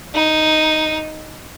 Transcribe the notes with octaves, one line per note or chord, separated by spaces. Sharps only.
D#4